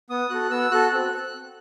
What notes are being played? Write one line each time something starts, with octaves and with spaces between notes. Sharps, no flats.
B3 D#6
F#4 A4 F#6
B3 E6
F#4 A4 F#6
C4